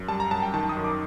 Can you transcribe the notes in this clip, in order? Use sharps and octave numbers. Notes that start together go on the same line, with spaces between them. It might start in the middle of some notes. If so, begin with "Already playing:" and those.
Already playing: F#2
G3 A5
A#5
F#2 A5
G5
D#3 A5
D#6
F#2
D6